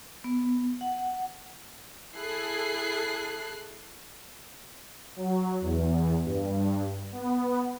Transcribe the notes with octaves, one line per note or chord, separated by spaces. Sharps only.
B3
F#5
E4 G#4 A4 F#6 C7
F#3
E2
G2
B3